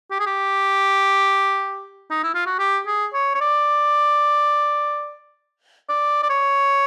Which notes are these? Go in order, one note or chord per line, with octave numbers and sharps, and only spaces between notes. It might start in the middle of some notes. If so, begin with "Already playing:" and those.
G4
G#4
G4
D#4
E4
F4
F#4
G4
G#4
C#5
C#5
D5
D5
D5
C#5